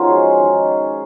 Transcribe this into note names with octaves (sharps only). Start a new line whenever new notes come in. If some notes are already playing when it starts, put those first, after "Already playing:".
Already playing: F3 C#4 D#4 F#4 G#4 A#4 C5
G#3
D#3